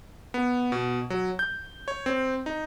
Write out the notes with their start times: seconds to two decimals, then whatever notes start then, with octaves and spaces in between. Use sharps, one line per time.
0.34 B3
0.72 B2
1.10 F#3
1.39 G6
1.88 C#5
2.06 C4
2.46 D#4